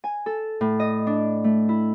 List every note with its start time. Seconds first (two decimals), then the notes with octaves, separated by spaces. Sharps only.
0.04 G#5
0.26 A4
0.61 A2
0.80 D#5
1.07 D4
1.44 A3
1.69 E4